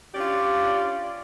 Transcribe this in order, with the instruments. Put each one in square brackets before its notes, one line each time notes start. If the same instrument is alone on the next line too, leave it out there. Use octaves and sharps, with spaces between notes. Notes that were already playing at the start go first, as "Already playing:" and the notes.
[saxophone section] C#4 D4 F4 G4 D5